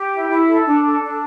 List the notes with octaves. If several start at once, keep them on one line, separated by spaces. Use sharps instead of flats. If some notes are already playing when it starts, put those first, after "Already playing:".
Already playing: G4
E4
E4
A4
D4
A4
D4